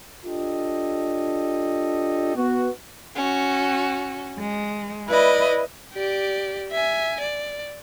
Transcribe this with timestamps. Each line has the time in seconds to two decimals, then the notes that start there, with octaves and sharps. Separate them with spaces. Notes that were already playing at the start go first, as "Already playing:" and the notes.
0.25 D4 F4 G4 A4 D#5
2.35 B3 F#4
3.16 C#4 F#4
4.38 G#3
5.08 E4 B4 D5 D#5
5.94 G4 D5
6.72 E5 G#5
7.20 D5